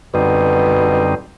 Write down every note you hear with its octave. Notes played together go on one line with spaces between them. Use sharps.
F#2 B2 D3 G3 C4 D#4